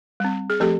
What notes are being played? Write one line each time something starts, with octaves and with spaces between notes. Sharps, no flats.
G3 C4
G#4
F3 A3 C4 G4 A4